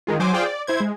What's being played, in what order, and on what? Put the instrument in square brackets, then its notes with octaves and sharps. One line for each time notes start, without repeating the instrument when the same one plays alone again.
[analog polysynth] D#3 G#3 F4
F#3 C5 G#5 D6
F4 G#4 C5 D5 F5 G5
D5
E4 C5 G#6
G#3